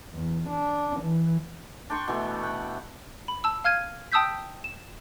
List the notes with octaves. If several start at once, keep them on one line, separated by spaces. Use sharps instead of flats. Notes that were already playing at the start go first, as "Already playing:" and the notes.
E2
D4
E3
D4 G5 C6 C#6
B2 E3 A3
F#5 G5
B5
A5 E6
F5 F6 G#6 D#7
G5 A5 D#6 E6 G6 B6
E7